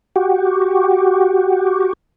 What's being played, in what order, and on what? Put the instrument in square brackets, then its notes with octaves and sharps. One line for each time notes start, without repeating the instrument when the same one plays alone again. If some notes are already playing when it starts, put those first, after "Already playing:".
[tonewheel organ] F#4 G4